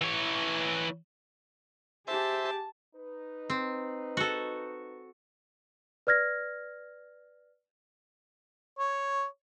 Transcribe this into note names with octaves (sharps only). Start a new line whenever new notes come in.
E3 C#5
G4 G#4 C5 E5 A5
D#4 B4
C4
F#4 A4
B4 D5 F6 G#6 A#6
C#5